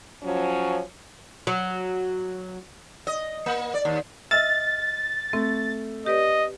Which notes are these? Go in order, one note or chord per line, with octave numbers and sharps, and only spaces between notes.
F3 F#3 C#4
F#3
D#5
A#3
D5
D#2
D#5 E5 E6 F6 A6
A3 C4
G4 B4 D5 D#5